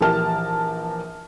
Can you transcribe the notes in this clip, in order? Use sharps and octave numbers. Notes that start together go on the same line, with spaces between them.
A#1 E3 G4 A#4 A5 F6